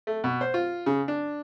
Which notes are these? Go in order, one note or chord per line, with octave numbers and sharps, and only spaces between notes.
A3
B2
C5
F4
C#3
D4